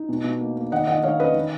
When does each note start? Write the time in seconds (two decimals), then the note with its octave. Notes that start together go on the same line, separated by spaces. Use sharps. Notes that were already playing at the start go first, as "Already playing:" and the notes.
Already playing: D#4
0.09 B2
0.24 B2
0.40 A#3
0.56 A#3
0.72 D#3 D#5 F#5
0.87 D#3 D#5 F#5
1.03 D#3 C#5 F5
1.19 C#4 B4 D#5
1.35 D#3